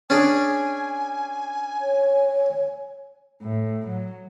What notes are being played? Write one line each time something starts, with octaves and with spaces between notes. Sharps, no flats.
C#4 D4 G#4 G#5
C#5
A2
F#3